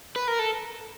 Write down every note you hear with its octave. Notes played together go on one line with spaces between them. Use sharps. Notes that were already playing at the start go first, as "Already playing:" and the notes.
B4
A#4
A4